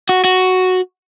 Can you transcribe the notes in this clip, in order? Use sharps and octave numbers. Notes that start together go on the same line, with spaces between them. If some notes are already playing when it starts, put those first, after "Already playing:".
F#4
F#4